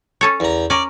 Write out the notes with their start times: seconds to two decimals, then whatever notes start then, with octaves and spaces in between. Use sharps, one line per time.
0.21 C#4 A4 C#5
0.40 E2 A#5
0.70 C#4 A#4 D5